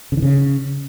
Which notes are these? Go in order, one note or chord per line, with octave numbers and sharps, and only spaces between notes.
C#3
D#3
C#3